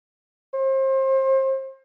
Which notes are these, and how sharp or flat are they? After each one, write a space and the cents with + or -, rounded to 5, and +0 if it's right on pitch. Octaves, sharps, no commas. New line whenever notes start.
C5 +30